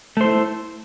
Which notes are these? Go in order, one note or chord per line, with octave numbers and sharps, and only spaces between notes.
A3 E4 C5